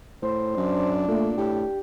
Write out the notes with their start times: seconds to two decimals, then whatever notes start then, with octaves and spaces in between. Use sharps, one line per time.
0.22 A2 C5
0.57 F#2 D4
1.08 A#2 A3
1.38 A2 G4